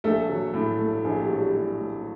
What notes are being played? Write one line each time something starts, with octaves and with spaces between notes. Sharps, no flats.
A#1 A3 A4
F#3
A2
A3
A#1 G#4
G4
F#3 F#4
G3 G4
A2
A3